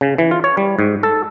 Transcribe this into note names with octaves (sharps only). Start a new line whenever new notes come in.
C#3
E3
F4
C#5
G3
G#2
A4